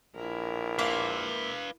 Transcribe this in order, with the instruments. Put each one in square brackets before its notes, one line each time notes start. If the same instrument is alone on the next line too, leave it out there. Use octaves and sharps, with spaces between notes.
[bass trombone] A#1 [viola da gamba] E4 A#4
[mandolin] A#3 C5 E5 [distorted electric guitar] B4 F5